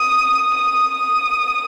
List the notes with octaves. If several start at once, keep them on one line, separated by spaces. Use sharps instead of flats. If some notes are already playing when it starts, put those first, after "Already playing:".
Already playing: D#6
D#6
D#6